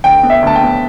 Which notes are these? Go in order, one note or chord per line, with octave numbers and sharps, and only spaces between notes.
D2 G5
B3
E5
D2 A5
G5
B3